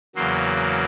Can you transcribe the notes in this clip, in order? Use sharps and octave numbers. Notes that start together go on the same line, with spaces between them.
E2 C#3 F#3 A#3 C6